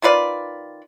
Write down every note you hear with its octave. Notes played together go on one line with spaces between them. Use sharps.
D#3 F4 B4 D5